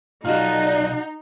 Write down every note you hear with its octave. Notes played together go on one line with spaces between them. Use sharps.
B1 D#4 F4 F#4 D5 D#5